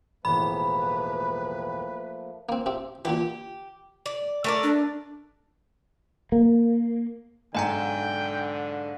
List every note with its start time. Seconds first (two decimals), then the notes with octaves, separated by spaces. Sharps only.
0.25 E1 A1 F3 A3 A#3 B4 B5
2.49 A#3 C4
2.66 C4 G4 E5
3.05 A#2 D3 E3 G4
4.06 D5
4.44 A3 A#4 D5
4.63 D4
6.32 A#3
7.55 B1 G#2 D3 D#5 G5 G#5 A#5